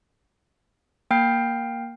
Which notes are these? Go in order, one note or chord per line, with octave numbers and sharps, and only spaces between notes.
A#3 G5 F6 G6 C7